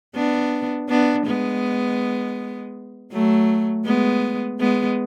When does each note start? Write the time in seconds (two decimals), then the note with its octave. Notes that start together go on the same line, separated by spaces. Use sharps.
0.15 B3 D4
0.89 B3 D4
1.26 G#3 B3
3.12 F#3 A3
3.85 G#3 B3
4.60 G#3 B3